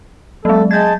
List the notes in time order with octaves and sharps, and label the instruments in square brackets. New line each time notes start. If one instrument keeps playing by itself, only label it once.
[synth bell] F#3 G#3 [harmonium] A4
[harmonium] G#3 A5 [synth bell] G6 G#6